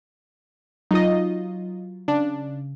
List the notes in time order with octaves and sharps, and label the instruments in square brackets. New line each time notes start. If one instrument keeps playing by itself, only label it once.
[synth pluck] F#3 F4 [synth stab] D#4 D#5
[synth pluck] C#3 [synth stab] D4